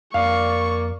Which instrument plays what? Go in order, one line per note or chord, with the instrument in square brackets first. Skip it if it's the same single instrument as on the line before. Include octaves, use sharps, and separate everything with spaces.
[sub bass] F2 [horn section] A#3 D5 [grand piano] F5 [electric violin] C#6